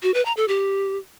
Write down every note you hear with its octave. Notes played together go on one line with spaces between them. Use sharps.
F#4
B4
A#5
A4
G4